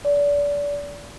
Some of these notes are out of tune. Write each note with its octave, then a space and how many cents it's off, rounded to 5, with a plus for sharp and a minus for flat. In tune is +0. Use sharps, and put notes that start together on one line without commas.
D5 -30